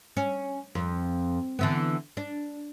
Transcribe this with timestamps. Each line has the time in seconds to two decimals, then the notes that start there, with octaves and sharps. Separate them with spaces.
0.17 C#4
0.75 F2
1.59 D3 E3 B3
2.17 D4